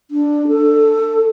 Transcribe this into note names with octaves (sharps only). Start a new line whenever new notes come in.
D4
A4